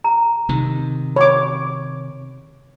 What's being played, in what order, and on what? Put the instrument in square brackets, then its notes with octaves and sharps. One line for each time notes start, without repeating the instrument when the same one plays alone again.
[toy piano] A#5
[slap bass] C3 D#3
[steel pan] C#5 D6 [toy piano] B5